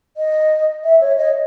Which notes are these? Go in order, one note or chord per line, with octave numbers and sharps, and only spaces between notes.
D#5
E5
C#5
D#5